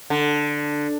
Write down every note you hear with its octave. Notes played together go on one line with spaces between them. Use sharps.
D3